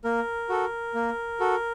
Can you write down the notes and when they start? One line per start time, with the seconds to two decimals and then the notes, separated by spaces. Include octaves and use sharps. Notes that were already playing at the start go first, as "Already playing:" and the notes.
0.04 A#3 A#4
0.49 F#4 A4
0.95 A#3
1.40 F#4 A4